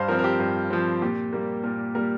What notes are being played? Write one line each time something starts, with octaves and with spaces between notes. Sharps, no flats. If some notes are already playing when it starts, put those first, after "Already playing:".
Already playing: G2 C5 F5
F3 C4 A#4
A#4
G4
G2 A#4
F3 C4
A#2 G4
G3 A#3
A#2 A#4
G3 A#3 A#4